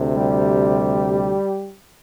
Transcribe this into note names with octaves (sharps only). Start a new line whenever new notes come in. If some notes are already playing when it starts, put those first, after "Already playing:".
Already playing: D2 C3
G3 G4